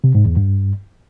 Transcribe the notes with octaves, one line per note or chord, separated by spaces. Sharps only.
C3
G#2
E2
G2